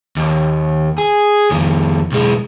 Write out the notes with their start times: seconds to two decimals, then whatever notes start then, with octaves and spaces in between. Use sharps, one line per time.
0.16 D#2
0.98 G#4
1.51 F2 D#3
2.12 B1 G#3